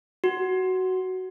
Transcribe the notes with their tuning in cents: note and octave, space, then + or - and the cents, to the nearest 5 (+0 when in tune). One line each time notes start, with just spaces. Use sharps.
F#4 +10